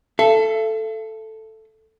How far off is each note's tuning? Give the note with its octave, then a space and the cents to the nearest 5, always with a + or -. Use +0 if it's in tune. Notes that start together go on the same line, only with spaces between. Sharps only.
A4 +0 E5 +45